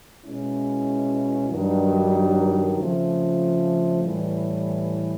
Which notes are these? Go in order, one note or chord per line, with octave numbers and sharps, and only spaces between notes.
B2 G#3 C#4 E4
G2 D#3 F#3
F2 C#3 F3 A3
A2 E3 G3